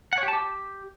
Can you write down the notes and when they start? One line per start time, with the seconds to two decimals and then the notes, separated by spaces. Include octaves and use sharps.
0.13 F#5
0.18 C#5
0.23 G4
0.28 A5
0.33 G4